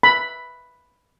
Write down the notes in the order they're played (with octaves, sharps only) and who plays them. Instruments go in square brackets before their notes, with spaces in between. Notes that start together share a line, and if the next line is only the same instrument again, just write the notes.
[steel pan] B5